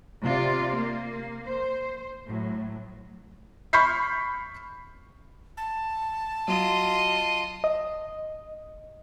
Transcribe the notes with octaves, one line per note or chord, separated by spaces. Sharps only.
C3 F4 D5
A#3
C5
A2 F#3
B5 C#6 F6 G6 B6 C7
A5
F#3 F4 D#5
D#5